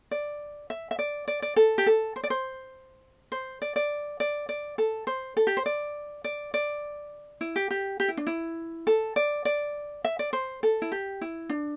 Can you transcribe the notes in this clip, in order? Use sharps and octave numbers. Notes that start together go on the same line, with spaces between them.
D5
E5
E5
D5
D5
D5
A4
G4
A4
C5
D5
C5
C5
D5
D5
D5
D5
A4
C5
A4
G4
C5
D5
D5
D5
E4
G4
G4
G4
E4
D4
E4
A4
D5
D5
E5
D5
C5
A4
E4
G4
E4
D4